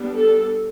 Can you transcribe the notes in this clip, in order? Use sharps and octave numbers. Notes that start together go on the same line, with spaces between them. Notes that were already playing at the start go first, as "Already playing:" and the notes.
Already playing: G3 B3 D4
A4